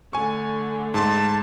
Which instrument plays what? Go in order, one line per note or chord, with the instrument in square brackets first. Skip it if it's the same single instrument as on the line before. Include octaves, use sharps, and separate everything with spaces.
[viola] D3 A3 [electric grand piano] G#5 C#6
[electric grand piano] G#2 C6 [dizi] A5